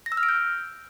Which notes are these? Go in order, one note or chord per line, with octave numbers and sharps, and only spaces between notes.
A#6
E6
F6
D7
G6